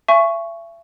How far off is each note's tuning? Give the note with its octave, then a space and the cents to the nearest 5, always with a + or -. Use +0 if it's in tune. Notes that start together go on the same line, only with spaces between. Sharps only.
E5 +35 G#5 +15 C#6 +0